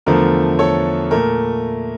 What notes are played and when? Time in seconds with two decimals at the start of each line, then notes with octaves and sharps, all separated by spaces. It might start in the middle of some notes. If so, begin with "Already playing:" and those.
0.06 E2 D3 F3 A3 A#4
0.59 A4 C#5
1.11 A#2 A3 A#4